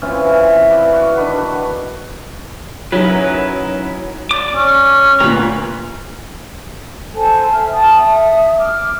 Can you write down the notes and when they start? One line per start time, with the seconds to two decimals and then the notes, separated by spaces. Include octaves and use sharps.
0.02 E3 C4 C#4 F4
0.32 E5
0.70 B4 D5 E5 F5
0.93 F#4
1.17 D#3 D4 B4
1.32 F#4
2.92 F#3 C#4 D#4 E4 A#4 B4
4.31 D5 D6
4.55 C#4
5.20 D2 A#2 A#4 B4
7.15 A4 C5 G#5 A5
7.52 E5 F6
7.73 G5 A5 D#6
7.97 E5 D#6
8.58 D6 F6